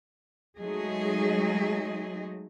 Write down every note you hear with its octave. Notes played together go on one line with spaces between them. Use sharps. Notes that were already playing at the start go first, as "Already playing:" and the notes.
F#3 G#3 A3 D#4 G#4 D#5